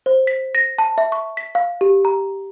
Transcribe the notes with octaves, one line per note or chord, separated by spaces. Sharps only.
C5
B6
A#6
A5
E5
C#6
B6
F5
G4
A#5